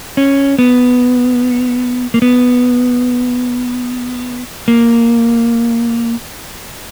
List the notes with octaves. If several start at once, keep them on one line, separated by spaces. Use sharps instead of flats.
C#4
B3
A#3
B3
A#3